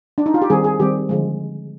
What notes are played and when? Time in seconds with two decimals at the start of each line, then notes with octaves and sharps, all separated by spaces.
0.18 D4
0.26 D#4
0.34 F4
0.42 G4
0.50 D#3 G3 C4 G#4
0.64 G#4
0.79 D#3 G3 C4 G4
1.09 D3 F3 G#3